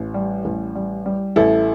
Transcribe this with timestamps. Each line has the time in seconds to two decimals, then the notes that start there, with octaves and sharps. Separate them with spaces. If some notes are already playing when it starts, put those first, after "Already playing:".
Already playing: A1
0.14 G3
0.45 A1
0.75 G3
1.06 G3
1.36 A1 E4 A4